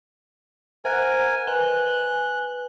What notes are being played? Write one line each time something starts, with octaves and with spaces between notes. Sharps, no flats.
A#4 C5 F#5 G#5 F#6
B4 G#5 F#6 G7